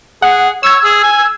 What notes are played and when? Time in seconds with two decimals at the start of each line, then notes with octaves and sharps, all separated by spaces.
0.22 G#4 F#5
0.63 C#5 E6 G#6
0.84 G#4
1.03 G#5